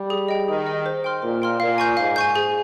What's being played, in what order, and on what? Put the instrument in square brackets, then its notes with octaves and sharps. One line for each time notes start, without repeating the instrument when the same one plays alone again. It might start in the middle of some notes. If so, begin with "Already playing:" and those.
Already playing: [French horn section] G3
[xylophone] G#4
D#5 G5
[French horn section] D#3 [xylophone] G#4
[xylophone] D#5 G5
C5
G5 C6 F6
[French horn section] A#2 [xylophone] C5
[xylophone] G5 C6 F6
[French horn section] A#2 [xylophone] F5
[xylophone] G#5 C#6 G6
[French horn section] G#2 [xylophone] F5
[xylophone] G#5 C#6 G6
G#4